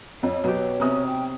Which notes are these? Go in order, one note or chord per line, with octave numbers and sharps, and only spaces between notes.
F2 C#5
B2 F#3 G4
B1 C3 C#4 D#6
G5